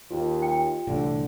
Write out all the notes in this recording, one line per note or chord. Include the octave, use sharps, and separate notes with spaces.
D#2 F4 G4
G5
C2 A2 D3 E3